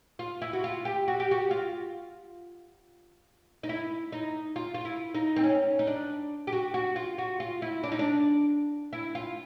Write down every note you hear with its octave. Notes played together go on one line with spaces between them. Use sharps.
F4
E4
F#4
F4
G4
F#4
G4
F#4
F4
D#4
E4
D#4
F4
F4
E4
D#4
C4
C#4
D#4
D4
G4
F#4
F#4
F4
F#4
F4
E4
D4
D#4
D4
E4
F4